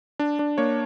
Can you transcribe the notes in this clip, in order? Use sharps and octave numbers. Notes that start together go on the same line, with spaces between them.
D4
D4
A#3 C#5